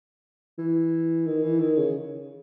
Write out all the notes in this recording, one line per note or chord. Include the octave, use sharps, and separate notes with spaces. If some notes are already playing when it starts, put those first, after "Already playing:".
E3
D#3
E3
D#3
C#3